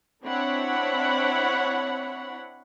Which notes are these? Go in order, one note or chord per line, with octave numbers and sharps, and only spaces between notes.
C4 D4 E4 C#5 F#5 B5